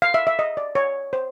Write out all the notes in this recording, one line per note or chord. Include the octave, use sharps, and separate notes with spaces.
F5
E5
E5
D#5
D5
C#5
C5